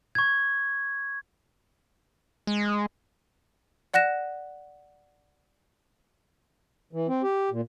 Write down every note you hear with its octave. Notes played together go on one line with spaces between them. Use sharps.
C#6 G#6
G#3
D5 F#5 F#6 A#6 E7
E3
C4
G4
A#2